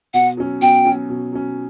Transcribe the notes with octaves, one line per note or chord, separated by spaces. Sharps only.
B2 F#5
F#3 C#4
B2 G5
F#3 C#4
B2
F#3 C#4